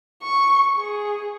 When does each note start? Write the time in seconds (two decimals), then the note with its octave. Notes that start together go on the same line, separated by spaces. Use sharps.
0.23 C#6
0.77 G#4